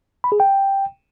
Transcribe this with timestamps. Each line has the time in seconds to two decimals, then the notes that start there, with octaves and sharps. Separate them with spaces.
0.24 B5
0.32 G#4
0.40 G5